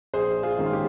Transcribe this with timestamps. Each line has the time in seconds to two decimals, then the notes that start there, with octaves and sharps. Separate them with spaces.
0.14 A#1 G#4 C5
0.43 F4 G#4
0.58 G#2 D#3 A#3 C#4
0.66 F4
0.73 G4